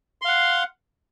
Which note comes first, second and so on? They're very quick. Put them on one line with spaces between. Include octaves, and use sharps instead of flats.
C6 F5 F#5